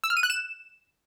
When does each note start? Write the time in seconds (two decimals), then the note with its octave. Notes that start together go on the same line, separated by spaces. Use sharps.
0.04 E6
0.10 F6
0.17 D#7
0.23 F#6
0.30 E7